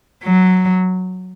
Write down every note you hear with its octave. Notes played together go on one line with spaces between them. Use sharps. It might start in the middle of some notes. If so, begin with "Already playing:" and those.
F#3